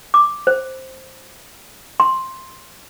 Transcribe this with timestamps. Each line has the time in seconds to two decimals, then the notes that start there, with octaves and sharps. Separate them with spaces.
0.14 D6
0.47 C5
2.00 C6